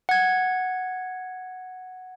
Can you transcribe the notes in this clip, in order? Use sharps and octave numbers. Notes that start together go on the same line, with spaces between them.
F#5 G#6